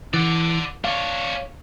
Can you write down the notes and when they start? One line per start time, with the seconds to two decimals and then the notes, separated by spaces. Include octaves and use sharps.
0.14 E3 D5 F#5
0.84 D4 C#5 F5